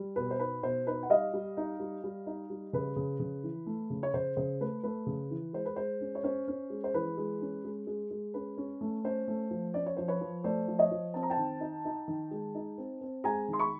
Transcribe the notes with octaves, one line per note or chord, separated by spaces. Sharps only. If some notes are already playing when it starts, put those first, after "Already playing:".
Already playing: G3
B2 B4
C5
D#4 B4
B2 C5
D#4 B4
F#5
G3 D#5 F5
G3
D#4
G3
G3
D#4
G3
C#3 B4
C#3
C#3
E3
A3
C#3
C#5
C#3 C5
C#3 C5
A3 B4
A3 B4
C#3
E3
G#3 C5
B4
G#3 C5
C#4
C#5
C#4 C5
C#4
G#3
C5
E3 B4
G#3
C#4
G#3
G#3
G#3
C#4 B4
C#4
A3
C#4 C5
A3
F3
C#4 D5
C#5
F3 C5
B4 C#5
F3
A3 C5 D5
F3
C#5 D#5
F3
C4 A5
A#5
G5 A5
D#3
D#4
D#4
D#3
G#3
D#4
C4
C4
G#3 G#5 A#5
D#3
C6
B5 C#6